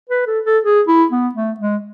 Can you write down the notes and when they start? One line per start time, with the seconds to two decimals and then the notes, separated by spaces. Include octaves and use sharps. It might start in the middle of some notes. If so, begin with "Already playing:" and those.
0.09 B4
0.27 A4
0.46 A4
0.64 G#4
0.88 E4
1.12 B3
1.35 A3
1.60 G#3